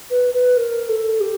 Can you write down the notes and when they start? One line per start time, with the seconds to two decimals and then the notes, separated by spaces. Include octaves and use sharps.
0.10 B4
0.34 B4
0.57 A#4
0.89 A4
1.21 G4